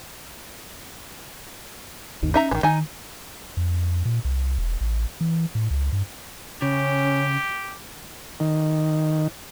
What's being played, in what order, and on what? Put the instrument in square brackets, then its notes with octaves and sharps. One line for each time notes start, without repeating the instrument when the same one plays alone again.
[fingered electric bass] G#1 D#2 D#3
[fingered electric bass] C#4 [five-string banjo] D#4 E5 A#5
[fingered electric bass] A1 [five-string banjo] D#3 E3
[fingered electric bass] D#3 [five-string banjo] D#4 G#5
[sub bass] F2
A#2
C2
E1
A1
E3
A2
C#2
G2
[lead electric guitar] C#3 [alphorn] C#4 [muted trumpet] G4
[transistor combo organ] D#3